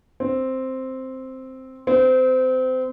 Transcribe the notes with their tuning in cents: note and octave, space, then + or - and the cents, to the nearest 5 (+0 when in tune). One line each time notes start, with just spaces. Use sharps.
C4 +0
C4 -25